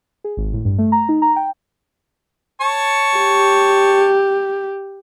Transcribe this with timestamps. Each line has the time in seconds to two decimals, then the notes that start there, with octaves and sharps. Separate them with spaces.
0.24 G#4
0.37 G#1
0.53 A2
0.65 G2
0.78 A3
0.92 A#5
1.09 D#4
1.22 A#5
1.36 G5
2.61 C#5 A5 C#6
3.17 G4